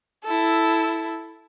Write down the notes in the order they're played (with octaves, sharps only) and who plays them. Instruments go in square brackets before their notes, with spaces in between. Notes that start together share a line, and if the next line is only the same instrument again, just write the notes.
[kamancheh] E4 A4